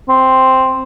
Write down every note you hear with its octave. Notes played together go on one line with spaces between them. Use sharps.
C4